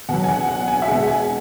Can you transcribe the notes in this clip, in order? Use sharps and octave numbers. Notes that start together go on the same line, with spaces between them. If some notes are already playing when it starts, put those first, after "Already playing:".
B2 F#3 F#5
G#5
F#5
F#5
G#5
E5
B2 G#3 F#5
G#5